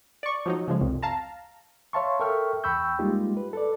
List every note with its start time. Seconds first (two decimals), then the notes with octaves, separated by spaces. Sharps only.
0.23 D5 C#6
0.46 F3 F#3 D#4
0.68 C#3 F3 G#3
0.80 C2 F2
1.02 F5 A5 A#5
1.93 C#5 E5 F5 A5 C6 C#6
2.20 A4 A#4 E5 G5 C#6 F6
2.64 E2 G5 B5 C#6 E6 G6
2.99 G3 G#3 A#3 D#4 F4 G4
3.37 B4
3.53 A4 B4 D5